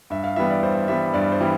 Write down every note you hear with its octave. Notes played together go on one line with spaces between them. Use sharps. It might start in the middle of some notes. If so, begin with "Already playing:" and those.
G2 E5
F5
E3 G3 B3 E5
D5
G2 C5
E3 G3 B3 E5
G2 D5
C5
E3 G3 B3